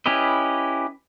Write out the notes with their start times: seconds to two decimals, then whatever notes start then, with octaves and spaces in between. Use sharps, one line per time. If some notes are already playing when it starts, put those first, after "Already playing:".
0.06 C#4 E4 G4 B4 D#5